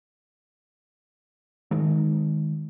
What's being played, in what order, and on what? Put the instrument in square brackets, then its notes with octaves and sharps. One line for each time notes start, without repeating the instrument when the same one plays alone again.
[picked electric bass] D#3 G#3